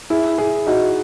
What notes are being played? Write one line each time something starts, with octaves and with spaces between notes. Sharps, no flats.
E4 G#4
E4 G#4
D#4 F#4